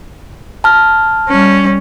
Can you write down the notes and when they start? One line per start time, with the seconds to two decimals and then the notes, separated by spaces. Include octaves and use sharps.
0.64 A5 F6
1.29 G3 C#4